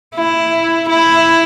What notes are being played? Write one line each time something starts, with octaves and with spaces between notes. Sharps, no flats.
E4
E4